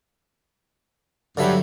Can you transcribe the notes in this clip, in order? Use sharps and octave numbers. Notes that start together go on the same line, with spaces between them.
G2 D3 F#3 E5